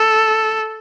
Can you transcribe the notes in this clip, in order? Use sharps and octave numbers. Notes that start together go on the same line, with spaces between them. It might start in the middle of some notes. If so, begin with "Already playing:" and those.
Already playing: A4